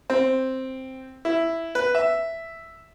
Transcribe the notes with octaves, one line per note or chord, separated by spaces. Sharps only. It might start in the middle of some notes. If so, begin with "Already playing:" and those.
C4
E4
B4
E5